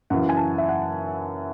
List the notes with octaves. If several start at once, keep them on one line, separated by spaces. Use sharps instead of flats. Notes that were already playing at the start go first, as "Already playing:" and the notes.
F#2 C#3 E3 F#5
G#5
A5
E5
F#5